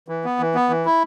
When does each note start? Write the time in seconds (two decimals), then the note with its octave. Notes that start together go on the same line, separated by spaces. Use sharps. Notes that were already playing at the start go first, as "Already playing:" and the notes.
0.08 E3
0.25 B3
0.39 E3
0.55 B3
0.69 E3
0.85 E4